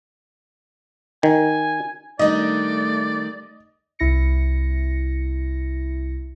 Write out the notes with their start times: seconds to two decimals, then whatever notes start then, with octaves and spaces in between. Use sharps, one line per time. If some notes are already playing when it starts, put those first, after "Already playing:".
1.23 D#3 G#5
2.19 D#3 G3 A3 D4 D5 D#5
3.99 C2 E4 A#6 C#7